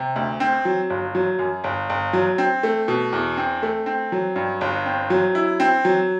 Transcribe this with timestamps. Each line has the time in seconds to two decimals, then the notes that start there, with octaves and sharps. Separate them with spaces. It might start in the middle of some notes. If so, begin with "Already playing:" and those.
Already playing: C3
0.16 D2
0.40 C4
0.65 F#3
0.90 G1
1.15 F#3
1.39 F#2
1.64 G1
1.89 G1
2.13 F#3
2.38 C4
2.63 A3
2.88 B2
3.12 E2
3.37 C4
3.63 A3
3.86 C4
4.12 F#3
4.36 G2
4.61 G1
4.86 C4
5.10 F#3
5.35 E4
5.60 C4
5.85 F#3